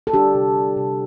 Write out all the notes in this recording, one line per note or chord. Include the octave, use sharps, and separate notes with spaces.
A4
G3 D4 G4
C3
C3
C3